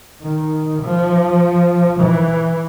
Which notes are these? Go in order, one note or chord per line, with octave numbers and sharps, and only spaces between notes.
D#3
F3
E3